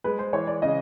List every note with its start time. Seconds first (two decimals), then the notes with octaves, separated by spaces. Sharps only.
0.04 G#3 B4
0.19 C5
0.33 E3 C#5
0.47 D5
0.62 C#3 D#5